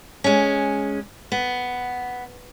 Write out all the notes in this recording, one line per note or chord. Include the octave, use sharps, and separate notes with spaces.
G#3 C#4
B3